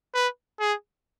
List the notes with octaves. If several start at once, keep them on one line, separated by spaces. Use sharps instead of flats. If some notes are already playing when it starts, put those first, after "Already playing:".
B4
G#4